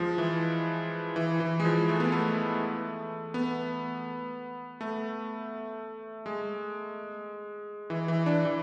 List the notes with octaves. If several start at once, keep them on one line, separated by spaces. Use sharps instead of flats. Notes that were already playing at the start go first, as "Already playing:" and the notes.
Already playing: F3 G#3
E3
E3
E3
G#3
F3
A3
B3
A3
B3
A3
G#3
E3
E3
D4
E3